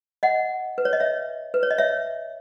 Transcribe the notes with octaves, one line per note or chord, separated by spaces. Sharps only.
D#5 F#5
B4
C#5
D#5
C#5 E5
B4
C#5
D#5
C#5 E5